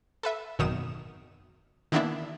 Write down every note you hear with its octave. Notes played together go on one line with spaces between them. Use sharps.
A4 B4 E5
G#1 F#2 B2 D#3 D#6 E7
D#3 E3 A#3 B3 D4 E4